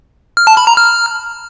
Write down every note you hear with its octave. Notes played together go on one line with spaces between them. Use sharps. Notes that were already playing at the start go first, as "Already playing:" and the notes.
F6
A5
B5
A#5
F6